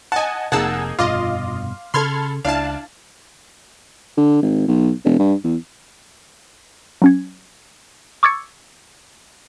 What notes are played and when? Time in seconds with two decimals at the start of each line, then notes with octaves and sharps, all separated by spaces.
0.12 D#5 F#5 G#5 A5
0.52 F1 C3 A#3 D#4 G#4 F#5 A5 E6
0.99 F1 G2 B2 F4 D#5 F5 C6 D6
1.94 C#3 A4 B5 C6 F6 G#6
2.45 C#2 D4 E4 F5 A5
4.17 D3
4.42 G#1
4.68 B1
5.05 E1
5.19 G2
5.44 E2
7.02 F#3 C#4 G#6
8.23 C#6 D6 E6 G#6 A6 C#7